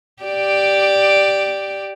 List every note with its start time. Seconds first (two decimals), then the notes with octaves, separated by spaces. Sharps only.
0.23 G4 D5